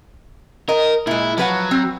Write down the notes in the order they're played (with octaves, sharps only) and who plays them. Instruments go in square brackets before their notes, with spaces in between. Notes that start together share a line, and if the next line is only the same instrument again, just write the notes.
[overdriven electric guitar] A#4 [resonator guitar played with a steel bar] D#5
[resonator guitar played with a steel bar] A#2 G#3 [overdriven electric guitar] E4
[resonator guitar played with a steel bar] F3 B4 F#5 [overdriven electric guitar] F#3
[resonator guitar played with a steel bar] C4